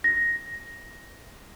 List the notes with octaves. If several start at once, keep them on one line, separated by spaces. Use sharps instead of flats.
A#6